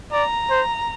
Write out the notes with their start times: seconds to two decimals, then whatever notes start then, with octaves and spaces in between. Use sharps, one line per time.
0.12 D5 A#5
0.50 C5